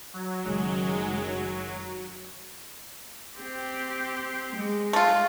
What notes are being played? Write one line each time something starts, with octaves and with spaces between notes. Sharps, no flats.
F#3
F#1 D#3 G#3
C4 G4
G#3
A3 F4